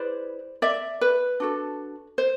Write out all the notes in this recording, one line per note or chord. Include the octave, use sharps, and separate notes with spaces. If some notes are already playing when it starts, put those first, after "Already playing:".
Already playing: E4 G#4 B4 C5 D5
D5 E5
B4
D4 F#4 A4
C5